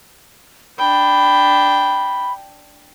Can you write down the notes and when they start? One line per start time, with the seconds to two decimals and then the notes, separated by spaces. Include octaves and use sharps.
0.79 D4 G5 B5